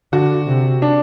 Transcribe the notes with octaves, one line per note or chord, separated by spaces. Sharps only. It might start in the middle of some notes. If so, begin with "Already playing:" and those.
D3 F#4
C3
D4